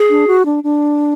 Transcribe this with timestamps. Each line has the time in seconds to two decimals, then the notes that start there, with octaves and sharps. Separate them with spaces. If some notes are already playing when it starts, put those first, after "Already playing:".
Already playing: G#4
0.10 D4
0.27 F#4
0.45 D4
0.64 D4